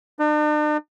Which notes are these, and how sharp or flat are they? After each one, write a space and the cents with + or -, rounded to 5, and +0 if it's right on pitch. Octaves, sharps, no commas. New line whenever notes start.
D4 +45